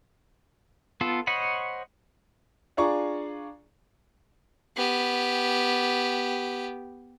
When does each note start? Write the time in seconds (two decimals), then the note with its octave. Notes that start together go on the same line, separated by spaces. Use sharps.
1.01 B3 F4 A4
1.27 C5 C#5 D#5 F#5 B5
2.77 D4 F4 G#4 D5 A#5 C#6
4.77 B3 G4